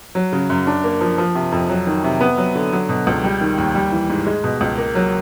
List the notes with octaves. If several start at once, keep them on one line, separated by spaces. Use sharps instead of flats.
F#3
C#3
F#2
D4
A#3
F3
F3
C3
F2
F#3
D#3
C3
B3
F#3
D3
F#3
B2
C#2
G3
D#3
D#2
G3
E3
G#2
G#3
B2
C#2
A#3
F#3